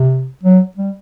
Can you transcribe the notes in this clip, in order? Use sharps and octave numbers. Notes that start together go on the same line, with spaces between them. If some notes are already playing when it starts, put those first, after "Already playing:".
Already playing: C3
F#3
G3